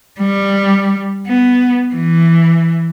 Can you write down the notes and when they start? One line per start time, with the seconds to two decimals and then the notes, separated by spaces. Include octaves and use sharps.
0.20 G3
1.27 B3
1.94 E3